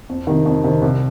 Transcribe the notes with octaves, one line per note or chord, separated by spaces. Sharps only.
F2
C3 D#3
F2
C3 D#3
C2